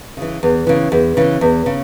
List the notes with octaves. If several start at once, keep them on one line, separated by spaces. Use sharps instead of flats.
C#3 E3
E2
C#3 E3
E2
C#3 E3
E2
C#3